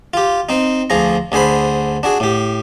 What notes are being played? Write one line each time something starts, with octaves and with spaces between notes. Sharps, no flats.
F4 G4
C4 D#4
D2 F3 G#4 A#5
D2 D3 G#4 C5 B5
D4 F#4 G#4
A2 G4